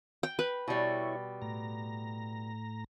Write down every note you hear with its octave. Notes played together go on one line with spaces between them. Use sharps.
G5
B4
B2 G3 E4 C#5
A2 A#5